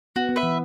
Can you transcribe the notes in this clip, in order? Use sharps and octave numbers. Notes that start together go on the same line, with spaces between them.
B3 F#4
B3
B4 E5
E3